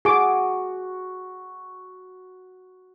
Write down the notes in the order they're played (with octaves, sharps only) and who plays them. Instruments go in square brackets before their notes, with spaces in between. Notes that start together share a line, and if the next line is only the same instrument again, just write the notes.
[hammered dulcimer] F#4 [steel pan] G#4 D6